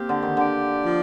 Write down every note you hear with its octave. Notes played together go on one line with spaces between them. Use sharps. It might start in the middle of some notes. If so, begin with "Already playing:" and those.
Already playing: A#3 C4 G4
D3
D#3
D3 D5
F3